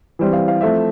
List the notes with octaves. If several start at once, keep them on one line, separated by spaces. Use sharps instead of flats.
E3 G3 C4
F5
F5
F3 A3 C4 E5